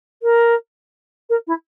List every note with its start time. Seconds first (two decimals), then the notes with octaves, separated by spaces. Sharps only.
0.22 A#4
1.29 A#4
1.47 E4